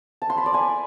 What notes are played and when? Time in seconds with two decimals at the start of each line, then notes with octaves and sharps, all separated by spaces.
0.22 A5
0.30 C6
0.38 B5
0.46 D5
0.54 G#5